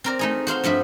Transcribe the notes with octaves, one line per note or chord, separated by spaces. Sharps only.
C4 A#4 D5
A3 D#4 G#4
F#4 C5 F5 C6
G2 F3 F#4 E5